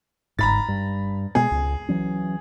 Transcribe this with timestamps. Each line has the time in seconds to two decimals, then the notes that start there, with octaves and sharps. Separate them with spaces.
0.39 G1 G#2 A#5 B5 A6
0.68 G2
1.35 B2 G#3 B3 G#4
1.51 C#2
1.89 E3 F#3 C#4